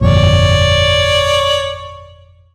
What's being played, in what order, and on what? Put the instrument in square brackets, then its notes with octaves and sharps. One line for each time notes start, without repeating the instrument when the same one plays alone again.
[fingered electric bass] G1 F2 A#2 [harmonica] C#5 D5